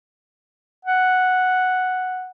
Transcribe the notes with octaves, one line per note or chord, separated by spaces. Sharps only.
F#5